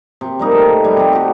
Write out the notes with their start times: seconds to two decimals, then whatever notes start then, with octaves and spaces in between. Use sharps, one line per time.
0.21 C3
0.39 G3 A#3 D#4
0.51 A3
0.84 G3
0.97 C3 A3
1.13 F#4 G4